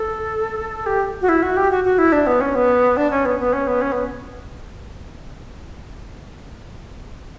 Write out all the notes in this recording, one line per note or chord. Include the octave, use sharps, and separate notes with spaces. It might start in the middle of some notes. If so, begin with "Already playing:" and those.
Already playing: A4
G4
F#4
E4
F#4
G4
F#4
F#4
E4
D4
B3
C#4
B3
D4
C#4
B3
B3
C#4
B3
C#4
B3